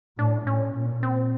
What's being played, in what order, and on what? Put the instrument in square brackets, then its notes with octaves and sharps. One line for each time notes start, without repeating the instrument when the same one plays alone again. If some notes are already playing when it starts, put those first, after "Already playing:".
[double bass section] A2 [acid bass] D4
[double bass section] A2 [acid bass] C#4
[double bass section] A#2
[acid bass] C4